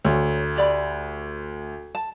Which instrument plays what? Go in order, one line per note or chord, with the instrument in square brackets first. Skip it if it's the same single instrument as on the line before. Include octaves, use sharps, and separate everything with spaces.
[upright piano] D2 [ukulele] C#5
[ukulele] G4 D5 B5
A5